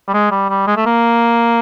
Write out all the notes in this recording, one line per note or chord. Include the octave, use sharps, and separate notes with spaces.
G3
G#3
G3
G3
G#3
A3
A#3